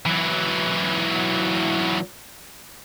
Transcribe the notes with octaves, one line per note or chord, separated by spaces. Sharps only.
E3 F#3